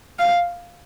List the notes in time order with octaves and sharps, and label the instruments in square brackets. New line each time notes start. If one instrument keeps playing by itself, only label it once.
[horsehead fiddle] F5